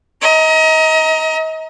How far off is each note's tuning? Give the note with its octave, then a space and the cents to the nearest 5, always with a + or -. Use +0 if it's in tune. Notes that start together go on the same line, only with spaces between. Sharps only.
D#5 +35 A#5 +0